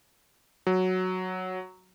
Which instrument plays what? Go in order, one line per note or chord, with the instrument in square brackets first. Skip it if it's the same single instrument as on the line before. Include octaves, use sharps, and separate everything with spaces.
[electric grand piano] F#3